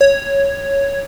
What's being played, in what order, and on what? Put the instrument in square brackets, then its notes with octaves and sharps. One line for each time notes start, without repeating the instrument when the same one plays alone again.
[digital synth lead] C#5